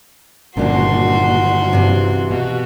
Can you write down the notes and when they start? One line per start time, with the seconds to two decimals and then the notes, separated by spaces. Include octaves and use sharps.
0.57 G1 A#2 C#3 D4 F#4 C6
1.71 G2 C3 E3
2.31 B2 F#4